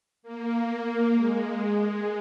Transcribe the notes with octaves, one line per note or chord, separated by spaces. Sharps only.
A#3
G#3
G#3